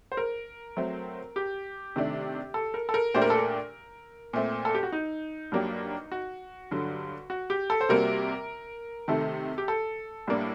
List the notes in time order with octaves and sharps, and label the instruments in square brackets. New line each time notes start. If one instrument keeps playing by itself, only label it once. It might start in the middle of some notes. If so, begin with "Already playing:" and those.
[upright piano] C5
A#4
[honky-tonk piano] F#3 A3 C4
[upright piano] G4
[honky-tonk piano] C3 D#3 A3 D4
[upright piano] A4
A#4
A4
A#4
[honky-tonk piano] A#2 A3 D4 G4 [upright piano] C5
[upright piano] A#4
A4
A#4
[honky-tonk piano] A#2 A3 C4
[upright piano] A4
G4
F#4
D#4
[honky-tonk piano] G2 F#3 A#3 D4 G4
[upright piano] F#4
[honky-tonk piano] G2 D3 F#3
[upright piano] F#4
G4
A4
C5
[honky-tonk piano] C3 G3 A#3 F#4 [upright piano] A#4
[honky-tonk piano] C3 D#3 A3 [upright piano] A4
[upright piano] G4
A4
[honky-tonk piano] A2 G3 A#3 D4